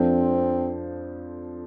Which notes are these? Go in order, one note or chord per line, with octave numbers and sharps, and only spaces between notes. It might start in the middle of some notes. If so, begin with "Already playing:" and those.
Already playing: F2 F3 C4 D4 A4 C5